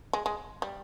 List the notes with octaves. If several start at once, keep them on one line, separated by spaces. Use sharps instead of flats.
G#3
G#3
G3